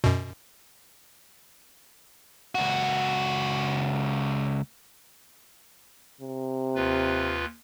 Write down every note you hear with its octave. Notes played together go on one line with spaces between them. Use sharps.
F#2 B2
C#2 F#4
C3
D#2 F4 B4